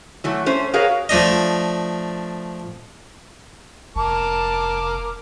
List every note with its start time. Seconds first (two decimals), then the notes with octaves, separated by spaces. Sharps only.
0.24 E3 F#3 A3
0.46 A3 C#4 C5
0.73 F#4 G#4 A#4 B4 C#5 F5
1.09 F3 A3 D4 D#5
3.96 F1 A#4 A5 D6